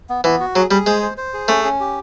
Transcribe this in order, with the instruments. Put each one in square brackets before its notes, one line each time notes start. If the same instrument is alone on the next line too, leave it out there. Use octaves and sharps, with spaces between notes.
[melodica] B3
[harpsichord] E3 [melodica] B3
[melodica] F#4
[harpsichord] F#3 [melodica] G#4
[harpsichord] G3 [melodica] G#4
[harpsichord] G#3 [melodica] C5
[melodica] C5
C5
G#4
[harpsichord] A3 [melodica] C#4
[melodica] C#4
G4